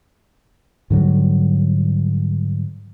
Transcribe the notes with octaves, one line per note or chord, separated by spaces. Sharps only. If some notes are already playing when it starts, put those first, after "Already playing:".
G#2 D3 F#3 G3